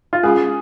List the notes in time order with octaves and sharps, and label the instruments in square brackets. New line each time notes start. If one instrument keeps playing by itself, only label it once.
[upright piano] F4
[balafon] G#3 C#4 F4 [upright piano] G#4